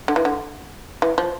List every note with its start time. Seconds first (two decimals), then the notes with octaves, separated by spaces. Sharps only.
0.08 D3
0.16 E3
0.25 D3
1.02 E3
1.18 F3